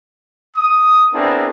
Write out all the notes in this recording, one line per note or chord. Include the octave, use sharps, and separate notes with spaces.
D#6
B3 C4 D4 E4 G#4 A#4